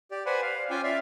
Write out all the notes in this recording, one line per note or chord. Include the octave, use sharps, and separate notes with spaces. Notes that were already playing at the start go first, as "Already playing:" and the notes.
G4 D5
B4 C5 D5 F#5 G#5 B5
F5
C#4 F4 G5 G#5 D6
D5 E5 F5